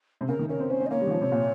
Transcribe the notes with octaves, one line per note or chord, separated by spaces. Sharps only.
C3
C#3 A#4
D#3
C#4 A#4
C4
C#4 C5
C#4
D#5
A#3 C#5
G3
D#3
F3
C3
A#2